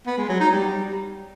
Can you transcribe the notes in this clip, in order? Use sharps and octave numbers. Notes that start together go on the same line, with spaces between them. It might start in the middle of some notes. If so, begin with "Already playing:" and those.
B3
G#3
F#3
D#4
G3